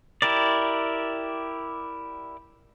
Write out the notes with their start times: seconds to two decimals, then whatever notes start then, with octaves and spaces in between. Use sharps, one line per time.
0.22 E4 G4 A#4 D5